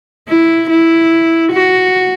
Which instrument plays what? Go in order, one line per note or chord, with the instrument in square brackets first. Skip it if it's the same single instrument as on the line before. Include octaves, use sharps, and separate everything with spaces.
[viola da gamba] E4
E4
F#4